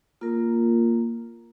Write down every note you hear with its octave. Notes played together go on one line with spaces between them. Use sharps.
A#3 F4 A#4